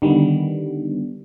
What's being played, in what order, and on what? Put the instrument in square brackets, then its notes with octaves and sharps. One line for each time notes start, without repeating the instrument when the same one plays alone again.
[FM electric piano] D3 D#3 G3 B3